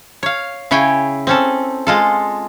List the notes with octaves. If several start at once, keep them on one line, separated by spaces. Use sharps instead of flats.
C#5 F5
C#3 E4 C#5 G5 G#5
C4 C#4 A4
G#3 F4 A4